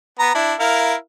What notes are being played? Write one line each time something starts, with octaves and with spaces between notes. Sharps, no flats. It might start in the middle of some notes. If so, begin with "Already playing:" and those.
B3 A#5
D4 E4
E4 A#4 F5